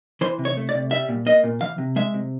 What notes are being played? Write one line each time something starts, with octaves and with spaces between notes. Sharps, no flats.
E3 C5
C3
C#5
A3
D5
C3
G3 E5
A#2
A#3 D#5
A#2
E3 F5
C3
G#3 E5
C3